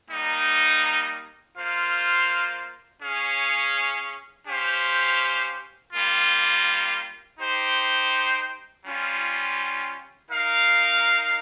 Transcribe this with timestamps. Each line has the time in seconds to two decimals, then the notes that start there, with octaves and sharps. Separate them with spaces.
0.11 G3 A#3 D#4
1.57 A#3 F4 C5 F5
3.02 C#4 G#4 C#5 F5
4.48 C#4 G4 C5 F5
5.93 G3 A#3 F4
7.39 D#4 G4 C5 G5
8.86 G3 C#4 F4
10.31 D#4 A#4 F5